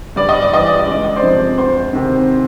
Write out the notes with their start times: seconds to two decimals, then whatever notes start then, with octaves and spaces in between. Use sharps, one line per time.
0.16 G2 D5
0.29 D#5
0.42 D5
0.52 E3 D#5
0.67 D5
0.79 D#5
0.86 C#2
0.92 D5
1.04 D#5
1.16 C5 D5
1.23 C3 F3
1.58 D2 C5
1.93 C3 D#3